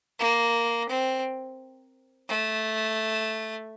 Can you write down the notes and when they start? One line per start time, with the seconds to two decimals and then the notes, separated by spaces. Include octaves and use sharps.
0.19 A#3
0.89 C4
2.29 A3